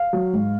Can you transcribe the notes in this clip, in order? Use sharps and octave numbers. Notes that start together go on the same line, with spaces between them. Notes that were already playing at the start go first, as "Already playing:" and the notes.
Already playing: F5
F#3
G#2